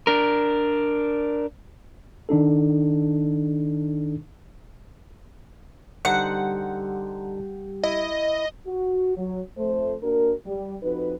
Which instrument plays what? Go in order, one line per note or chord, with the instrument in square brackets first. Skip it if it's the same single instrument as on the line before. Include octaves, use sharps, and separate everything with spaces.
[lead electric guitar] D4 A#4
[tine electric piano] D#3 D4 D#4 A4
[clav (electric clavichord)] D3 D#4 C5 [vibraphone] G3 G4 [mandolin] F#5
[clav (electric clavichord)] E4 [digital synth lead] D#5
[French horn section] F#4
F#3
F2 A3 C5
A#3 D4 F#4 A#4
G3
F2 D#4 F#4 B4